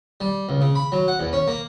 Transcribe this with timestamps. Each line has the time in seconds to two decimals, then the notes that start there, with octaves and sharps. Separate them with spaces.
0.21 G3
0.49 C#2
0.61 C#3
0.75 B5
0.92 F#3
1.08 F#5
1.19 E2
1.33 C#4
1.47 A#3